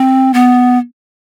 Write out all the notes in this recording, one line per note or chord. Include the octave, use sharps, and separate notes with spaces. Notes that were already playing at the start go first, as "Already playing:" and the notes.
Already playing: C4
B3